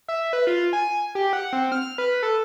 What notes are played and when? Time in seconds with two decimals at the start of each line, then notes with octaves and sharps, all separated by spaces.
0.08 E5
0.33 B4
0.47 F4
0.73 G#5
1.15 G4
1.33 F#5
1.53 C4
1.72 F6
1.98 B4
2.23 A4